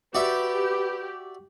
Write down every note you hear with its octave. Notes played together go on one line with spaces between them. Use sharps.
F#4 G4 B4 D5 E5